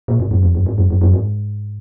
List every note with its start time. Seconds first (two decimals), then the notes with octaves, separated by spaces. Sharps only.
0.08 A#2
0.20 G#2
0.31 F#2
0.43 F2
0.55 F#2
0.66 G#2
0.78 F#2
0.90 F#2
1.01 F#2
1.13 G#2